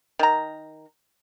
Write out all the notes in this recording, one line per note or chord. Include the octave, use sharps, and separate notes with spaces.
D#3 A#5